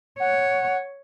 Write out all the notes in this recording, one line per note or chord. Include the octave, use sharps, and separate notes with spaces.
C#5 F#5